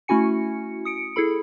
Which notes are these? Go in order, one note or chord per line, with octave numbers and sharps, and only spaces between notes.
A3 C#4 E4 F#4 G#5 C#7
D#6 C#7 D7
E4 G#4 A4 B5